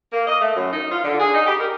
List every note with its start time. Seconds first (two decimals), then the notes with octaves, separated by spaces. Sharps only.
0.13 A#3
0.27 D#5
0.41 A3
0.56 F#2
0.73 D#4
0.91 F4
1.04 D3
1.20 G#4
1.34 D#4
1.46 G4
1.60 A#4